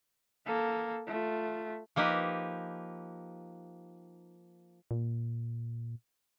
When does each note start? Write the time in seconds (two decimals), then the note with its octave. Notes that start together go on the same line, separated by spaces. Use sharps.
0.46 A#3 A4
1.07 A3 F4
1.96 F3 A#3 D#4 G4 B4
4.91 A#2